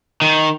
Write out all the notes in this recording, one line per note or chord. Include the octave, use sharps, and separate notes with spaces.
D#3